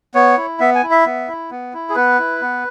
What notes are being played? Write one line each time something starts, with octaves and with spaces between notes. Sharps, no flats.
B3 C#5
E4
B3 E5
G#5
E4
E5
B3
E4
B3
E4
G#4
B3 B4
E4
B3